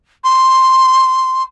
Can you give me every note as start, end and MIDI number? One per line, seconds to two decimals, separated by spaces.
0.24 1.42 84